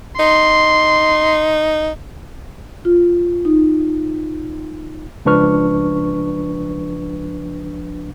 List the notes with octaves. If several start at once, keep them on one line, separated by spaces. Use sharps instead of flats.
D#4 C6
F4
D#4
C#2 F3 D4 B4 C#6 F6